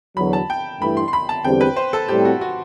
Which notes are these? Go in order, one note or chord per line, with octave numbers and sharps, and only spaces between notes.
E2 D3 F#3 B5
A5
G5
G2 E3 A3 E4 B5
C6
C6
B5
A5
E2 D3 G3 C4 G4 G5
B4
C5
A4
A2 G3 C4 G4
F#4
F#4